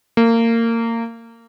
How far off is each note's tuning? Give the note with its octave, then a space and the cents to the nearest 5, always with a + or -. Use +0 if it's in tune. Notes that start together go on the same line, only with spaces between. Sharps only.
A#3 -25